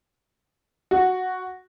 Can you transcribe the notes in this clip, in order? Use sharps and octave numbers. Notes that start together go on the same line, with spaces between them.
F#4